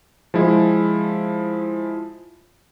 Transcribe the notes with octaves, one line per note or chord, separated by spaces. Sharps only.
F3 G#3 E4